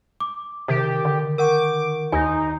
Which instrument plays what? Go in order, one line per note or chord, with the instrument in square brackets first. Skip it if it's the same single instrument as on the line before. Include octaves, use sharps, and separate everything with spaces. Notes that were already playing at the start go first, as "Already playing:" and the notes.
[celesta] D6
[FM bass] C3 [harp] D#3 A5 [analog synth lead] G4
[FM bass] D3
[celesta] A#4 F#5 [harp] C#6 G6 [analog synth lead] D6
[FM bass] D#2 [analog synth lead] D#4 [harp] C5 [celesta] G#5